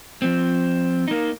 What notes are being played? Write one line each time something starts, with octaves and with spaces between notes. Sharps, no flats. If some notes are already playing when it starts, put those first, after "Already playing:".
F3 C4
A#3 D#4